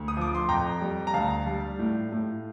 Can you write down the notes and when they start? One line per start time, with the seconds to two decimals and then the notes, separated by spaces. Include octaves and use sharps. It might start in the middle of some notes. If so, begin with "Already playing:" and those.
Already playing: D2
0.08 D#6
0.17 F3 D6
0.35 C6
0.49 F2 G5 A#5
0.81 G3
1.07 A#5
1.14 D2 F5 A5
1.47 G3
1.79 A2
2.12 A2